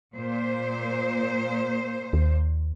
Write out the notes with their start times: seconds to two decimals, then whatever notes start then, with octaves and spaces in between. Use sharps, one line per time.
0.16 A#2 C5
2.13 D#2